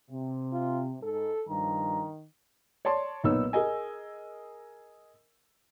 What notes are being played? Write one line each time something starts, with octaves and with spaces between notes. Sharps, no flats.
C3
F4
G#2 A4
G2 D#3 F3 A#5
C#5 D5 A5 C6
B1 A#2 B3 D#4 C#5 E6
G#4 A#4 D#5 G#5